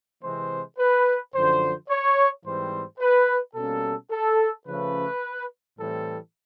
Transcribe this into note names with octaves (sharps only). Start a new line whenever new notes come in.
C3 E3 G#3 C4 C5
B4
F#2 D3 F3 C5
C#5
G#2 E3 G3 C4 C5
B4
B2 G3 A#3 C#4 A4
A4
C#3 F3 A3 C#4 B4
A2 E3 G3 C4 A4